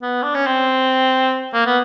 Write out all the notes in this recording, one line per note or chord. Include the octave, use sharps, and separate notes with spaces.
B3
D4
C#4
C4
A#3
B3